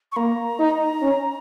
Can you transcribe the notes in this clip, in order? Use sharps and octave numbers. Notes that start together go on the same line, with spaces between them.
C#6
A#3 A#5
D#4
C#4